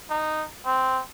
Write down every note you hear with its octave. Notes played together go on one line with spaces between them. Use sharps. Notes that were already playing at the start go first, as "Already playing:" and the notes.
D#4
C4